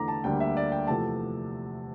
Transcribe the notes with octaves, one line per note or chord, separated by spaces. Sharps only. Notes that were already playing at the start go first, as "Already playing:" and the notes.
Already playing: E2 D3 A3 A#5 D6
A5
D2 D3 G3 A#3 G5
E5
D5
G5
E2 C3 F3 A3 A5